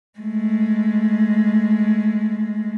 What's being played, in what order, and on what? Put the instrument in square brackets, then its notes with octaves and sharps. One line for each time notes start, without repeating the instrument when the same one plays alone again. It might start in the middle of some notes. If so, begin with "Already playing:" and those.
[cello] G#3 A3